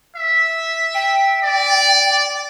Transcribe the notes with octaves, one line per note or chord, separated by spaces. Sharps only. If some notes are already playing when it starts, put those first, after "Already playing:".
E5
G5
D5